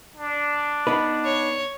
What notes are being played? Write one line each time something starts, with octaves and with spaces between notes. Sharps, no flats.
D4
B3 D#4 B4
C#5